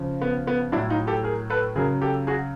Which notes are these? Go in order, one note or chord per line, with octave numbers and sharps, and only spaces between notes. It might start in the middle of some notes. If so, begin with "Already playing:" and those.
Already playing: C#3 F3
B3
B3
A2 F#3 D4 E4
D#4 F4
G4 A4
G#4 A#4
A4 B4
C#3 F#3 G#4 A#4
G4 A4
F#4 G#4